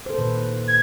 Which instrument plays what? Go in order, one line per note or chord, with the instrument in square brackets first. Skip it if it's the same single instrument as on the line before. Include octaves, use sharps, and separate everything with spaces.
[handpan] A4 C5
A#2 D#3 B4
[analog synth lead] G#6